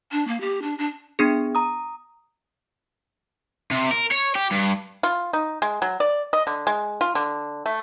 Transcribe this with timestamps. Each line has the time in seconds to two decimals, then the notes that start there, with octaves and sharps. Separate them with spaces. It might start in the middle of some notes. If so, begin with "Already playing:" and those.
0.12 D4
0.28 A#3
0.41 G4
0.62 D4
0.78 D4
1.19 B3 D4 G#4
1.55 A#5 D#6
3.71 C3
3.91 A#4
4.11 C#5
4.35 G4
4.52 G2
5.03 F4
5.33 D#4
5.62 G#3
5.82 F#3
6.00 D5
6.33 D#5
6.47 D3
6.67 G#3
7.01 F4
7.15 D3
7.66 A3